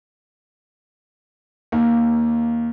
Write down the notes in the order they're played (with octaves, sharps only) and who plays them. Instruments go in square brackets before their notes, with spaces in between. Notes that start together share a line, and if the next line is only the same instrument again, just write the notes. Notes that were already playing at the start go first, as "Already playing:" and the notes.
[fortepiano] D#2